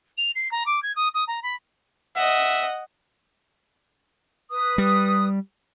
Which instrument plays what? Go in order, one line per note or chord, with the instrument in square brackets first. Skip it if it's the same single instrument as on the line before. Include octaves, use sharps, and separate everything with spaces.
[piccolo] F7
C7
A#5
D6
G#6
D#6
D#6
A#5
B5
[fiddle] D#5 F#5 [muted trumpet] E5
[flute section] B4 D#6
[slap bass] G3